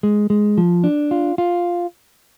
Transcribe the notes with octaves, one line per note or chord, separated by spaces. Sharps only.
G#3
G#3
F3
D4
F4
F4